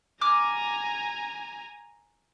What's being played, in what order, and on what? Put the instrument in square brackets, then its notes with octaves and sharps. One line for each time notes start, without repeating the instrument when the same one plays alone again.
[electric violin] G#5 A#5 [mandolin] D6 F6